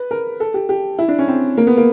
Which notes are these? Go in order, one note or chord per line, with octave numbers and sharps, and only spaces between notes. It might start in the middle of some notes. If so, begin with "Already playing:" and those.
Already playing: B4
A#4
A4
G4
G4
E4
D4
C#4
C4
A#3
B3
A#3